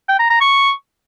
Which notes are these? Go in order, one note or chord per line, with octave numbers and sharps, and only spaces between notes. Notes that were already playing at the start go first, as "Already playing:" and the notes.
G5
A#5
A#5
C#6